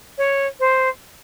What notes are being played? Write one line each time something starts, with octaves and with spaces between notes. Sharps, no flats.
C#5
C5